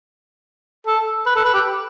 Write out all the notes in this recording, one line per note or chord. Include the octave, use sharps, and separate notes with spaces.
A4
B4
A4
B4
G4